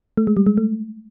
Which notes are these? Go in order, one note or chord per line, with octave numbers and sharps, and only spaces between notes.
A3
G#3
G3
G#3
A3